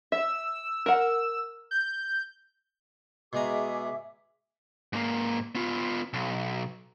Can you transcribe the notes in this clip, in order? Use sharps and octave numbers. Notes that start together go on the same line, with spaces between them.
E5 E6
A#4 F#5
G6
B2 G#3 G#4 E5 A#5 D6
G#2 A#3
B3 F4
B1